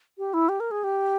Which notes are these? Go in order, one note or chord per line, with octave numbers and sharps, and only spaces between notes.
G4
E4
G4
A#4
G#4
G4